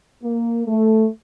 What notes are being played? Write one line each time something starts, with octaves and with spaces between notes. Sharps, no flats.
A#3
A3